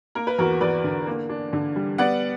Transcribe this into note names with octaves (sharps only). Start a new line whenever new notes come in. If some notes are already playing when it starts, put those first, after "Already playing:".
A#3 A#4
B4
E2 F#4 A#4
E2 B4 D5
D3
A#3
D4
D3
G3
B3 D5 F#5